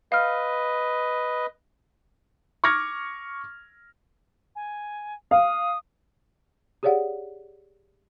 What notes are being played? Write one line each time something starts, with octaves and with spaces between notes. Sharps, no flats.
B4 D#5 F5 F6
C#6 D6 F6 G#6 A#6
G#5
F5 D#6
G4 G#4 C#5 D5 F5 F#5